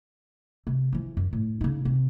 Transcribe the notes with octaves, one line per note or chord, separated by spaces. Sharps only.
C3
E3 F3
F#2
A2
C#3 D#4
C3 C4